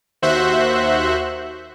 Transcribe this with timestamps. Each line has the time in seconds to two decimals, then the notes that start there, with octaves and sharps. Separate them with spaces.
0.22 D#2 F#4 C5 E5 F#6